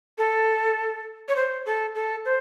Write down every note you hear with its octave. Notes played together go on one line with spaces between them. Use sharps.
A4
C#5
C5
A4
A4
C5